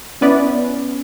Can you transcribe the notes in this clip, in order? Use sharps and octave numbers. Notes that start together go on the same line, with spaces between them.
B3 C#4 E4 B4 D5